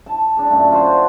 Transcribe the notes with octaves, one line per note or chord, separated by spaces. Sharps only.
A5
D4 G#4
F#2 A#2 A3 B5
F4 F#4 C5 G5